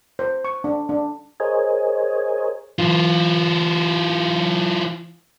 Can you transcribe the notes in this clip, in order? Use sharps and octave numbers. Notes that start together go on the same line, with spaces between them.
C5
C#6
D4
D4
G#4 A#4 C5 C#5 D#5 G#5
E3 F4